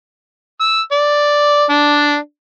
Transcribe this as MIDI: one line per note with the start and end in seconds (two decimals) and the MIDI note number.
0.61 0.81 88
0.92 1.64 74
1.70 2.16 62